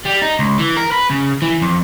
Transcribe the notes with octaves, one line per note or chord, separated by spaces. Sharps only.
G3
D#4
C#2
E3
A#4
B4
C#3
E3
F2